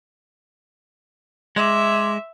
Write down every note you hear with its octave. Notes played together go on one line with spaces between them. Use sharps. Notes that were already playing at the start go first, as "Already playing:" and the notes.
G#3 E5 C6 D6